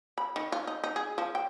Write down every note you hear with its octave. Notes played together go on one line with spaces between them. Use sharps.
B5
D#3
F4
D#4
D#4
G#4
F3
G5